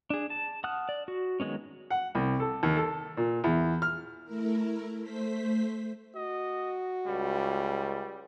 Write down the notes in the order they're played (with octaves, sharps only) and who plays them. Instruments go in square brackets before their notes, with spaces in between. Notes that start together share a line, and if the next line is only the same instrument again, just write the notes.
[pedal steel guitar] D4 G#4
A5
F#5 A5 D#6 F6 F#6
D5
F#4
D#3 F#3 G#3 B3 C#4
[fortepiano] F#5
C2
A4
D#2
A4
A#2
E2
F6
[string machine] A3 E4 A#4
A3 C5 B6
[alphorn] F#4 [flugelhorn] D#5
[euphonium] C#2 [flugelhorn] G3